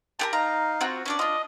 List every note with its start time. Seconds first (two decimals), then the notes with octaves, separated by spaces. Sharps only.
0.19 G4 G#4 A#4 A5
0.33 D#4 F5 A#5
0.81 C4 F4 F#4
1.06 C#4 D4 D5
1.19 D4 F4 D#5